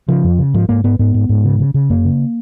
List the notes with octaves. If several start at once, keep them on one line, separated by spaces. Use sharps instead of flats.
C#3 F3
F2
C#3
G#2 F3
G#2 A#3
G#2 B3
G#2 B3
G#2
G#2
C#3
C#3
C#3
F#2 A#3
C#3